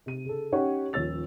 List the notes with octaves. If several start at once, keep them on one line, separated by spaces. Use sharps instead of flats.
C3 D#7
C#3 A4
C#4 D#4 G4 C#5 F#5 C#6
D#1 F3 C#5 E6 A6 F7